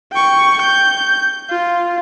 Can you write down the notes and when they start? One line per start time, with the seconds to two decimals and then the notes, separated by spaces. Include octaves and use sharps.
0.12 G5 C#6
0.62 G6
1.50 F4